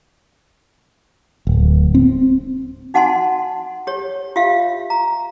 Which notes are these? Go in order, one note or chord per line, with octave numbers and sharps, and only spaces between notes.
D1
C4
D#4 F#4 F#5 G#5 A5 C6
G4 C#5
F4 G4 E5 F5
A#5